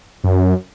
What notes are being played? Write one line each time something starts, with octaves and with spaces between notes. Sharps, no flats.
F#2